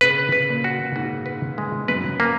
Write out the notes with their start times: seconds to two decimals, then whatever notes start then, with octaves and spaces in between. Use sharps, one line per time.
0.01 C#3 B4
0.32 B4
0.49 A#2
0.64 F#4
0.96 G#2 F#4
1.26 B4
1.58 G#3
1.88 F#2 B4
2.20 A#3